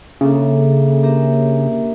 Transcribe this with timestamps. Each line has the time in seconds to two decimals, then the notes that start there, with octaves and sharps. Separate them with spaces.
0.21 C#3 A#3 D4 A4 E5
1.03 A#3 D4 G4 A#4 E5